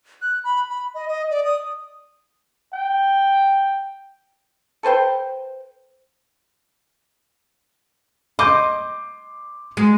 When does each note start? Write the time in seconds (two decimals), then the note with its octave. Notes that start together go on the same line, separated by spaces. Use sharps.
0.22 F#6
0.44 B5
0.70 B5
0.94 D#5
1.08 D#5
1.31 D5
1.44 D#6
2.73 G5
4.83 A4 B4 C5 G5
8.39 D#5 C6 D6 G6
9.77 G#3